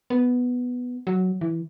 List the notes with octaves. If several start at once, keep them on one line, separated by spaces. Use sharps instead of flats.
B3
F#3
E3